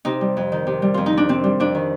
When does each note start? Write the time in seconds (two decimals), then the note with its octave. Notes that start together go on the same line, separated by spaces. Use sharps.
0.05 C3 D#4
0.21 G3
0.37 F2
0.52 D#3
0.67 C3
0.82 G3
0.94 F2 F4
1.06 D#4
1.13 D#3 D4
1.29 C3 C4
1.44 G3
1.60 F2 D4
1.75 D#3